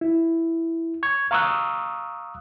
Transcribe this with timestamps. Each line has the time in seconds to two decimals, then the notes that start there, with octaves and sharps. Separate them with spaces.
0.01 E4
1.03 C#6 G#6
1.31 F5 A#5 C#6 D#6 E6 F#6